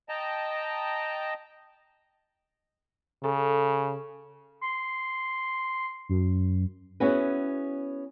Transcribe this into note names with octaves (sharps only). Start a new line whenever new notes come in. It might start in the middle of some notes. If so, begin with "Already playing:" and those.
D#5 G5 A5 A#5
C#3 A4
C6
F#2
B3 C#4 E4 F#4 G#4 B4